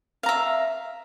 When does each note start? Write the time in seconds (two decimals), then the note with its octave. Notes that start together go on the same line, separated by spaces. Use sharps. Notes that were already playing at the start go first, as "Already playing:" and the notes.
0.23 F5
0.26 A#5
0.29 E5